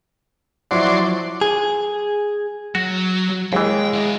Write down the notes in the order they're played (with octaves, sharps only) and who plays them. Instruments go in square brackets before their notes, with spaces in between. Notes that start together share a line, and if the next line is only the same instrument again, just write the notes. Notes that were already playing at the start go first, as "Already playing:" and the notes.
[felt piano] F3 E4 [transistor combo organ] F#3 D5 C6
[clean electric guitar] G#4
[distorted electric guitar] F#3 [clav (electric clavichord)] F#4
[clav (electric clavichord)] D#2 E3 [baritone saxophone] G#3 [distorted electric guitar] G5
[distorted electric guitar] E4 F#4